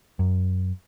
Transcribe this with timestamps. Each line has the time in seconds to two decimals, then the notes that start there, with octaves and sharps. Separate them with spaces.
0.19 F#2